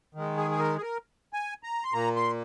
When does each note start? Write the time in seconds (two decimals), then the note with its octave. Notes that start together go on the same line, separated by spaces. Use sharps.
0.15 D#3 G#3
0.37 G#4
0.51 G#4
0.59 A#4
0.77 G#4
0.82 A#4
1.33 G#5
1.63 A#5
1.84 C6
1.93 A#2 A#3 A#5
2.16 C6